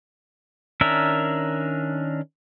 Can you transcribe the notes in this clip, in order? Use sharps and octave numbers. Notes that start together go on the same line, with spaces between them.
D#3 C#4 D4 A#4 E5